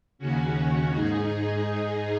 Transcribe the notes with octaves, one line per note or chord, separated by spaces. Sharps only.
D#2 C#3 C#4 F#4
G#2 D#4 G#4